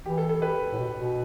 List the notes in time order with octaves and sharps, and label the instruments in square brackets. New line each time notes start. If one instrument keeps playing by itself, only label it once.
[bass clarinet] E3 [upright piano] G4
[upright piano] A4
A4
G4 B4
[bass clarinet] A2
B2
B2